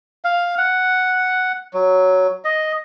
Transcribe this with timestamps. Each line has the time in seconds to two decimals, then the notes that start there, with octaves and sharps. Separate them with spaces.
0.25 F5
0.58 F#5
1.74 F#3
2.45 D#5